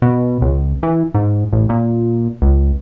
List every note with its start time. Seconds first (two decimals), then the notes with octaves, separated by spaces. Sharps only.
0.02 B2
0.41 C#2
0.83 E3
1.14 G#2
1.53 A1
1.69 A#2
2.42 C#2